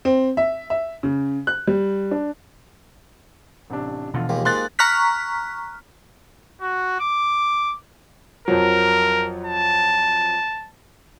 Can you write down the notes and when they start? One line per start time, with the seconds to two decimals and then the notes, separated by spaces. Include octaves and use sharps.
0.05 C4
0.37 E5
0.70 E5
1.03 C#3
1.47 F#6
1.67 G3
2.11 D4
3.70 A1 C3 D4
4.14 B2 D3 E3 F3 F4
4.29 D#2 G#3 F4 G4 F5
4.45 G#2 A#3 G#4 C6 F#6 A6
4.79 A#5 C#6 F6 F#6 B6
6.61 F#4
7.00 D6
8.48 F2 F3 F#3 A#4
9.46 A5